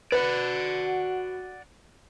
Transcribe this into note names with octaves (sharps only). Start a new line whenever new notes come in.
F#4 B4 D5 F#5